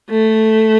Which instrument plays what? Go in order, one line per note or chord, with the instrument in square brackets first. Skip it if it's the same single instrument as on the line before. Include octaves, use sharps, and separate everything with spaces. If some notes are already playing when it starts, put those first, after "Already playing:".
[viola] A3